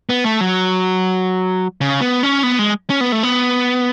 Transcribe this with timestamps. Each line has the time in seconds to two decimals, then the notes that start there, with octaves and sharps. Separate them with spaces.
0.09 B3
0.24 A3
0.41 F#3
1.81 C#3
2.01 B3
2.23 C#4
2.43 B3
2.59 G#3
2.90 C#4
3.01 B3
3.12 A3
3.23 B3